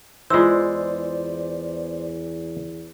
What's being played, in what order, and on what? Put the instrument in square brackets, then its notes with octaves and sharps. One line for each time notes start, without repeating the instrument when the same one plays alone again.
[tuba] E2 [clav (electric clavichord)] E3 G#3 [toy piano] F4 E6 [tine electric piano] C5 D5